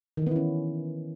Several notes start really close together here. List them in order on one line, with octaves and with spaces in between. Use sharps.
D#3 E3 B3 E4 C#4